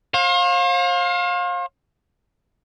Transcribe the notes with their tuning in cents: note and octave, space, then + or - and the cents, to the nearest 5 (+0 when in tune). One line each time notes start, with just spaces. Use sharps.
C5 +45 F5 +25